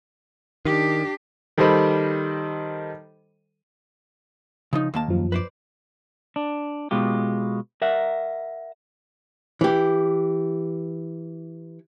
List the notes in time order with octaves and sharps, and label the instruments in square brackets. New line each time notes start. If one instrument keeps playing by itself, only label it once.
[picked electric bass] D#3 [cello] D4 G4
[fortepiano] D#3 G3 A4 C5 D#5 B5
[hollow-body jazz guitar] C#3 F3 D#4
D#2 A#3 A5
[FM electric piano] F#2 F3
[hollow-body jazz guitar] B4 C5 D5
[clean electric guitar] D4
B2 G#3 F4 G4
A#4 E5 F#5
[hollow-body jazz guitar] E3 G4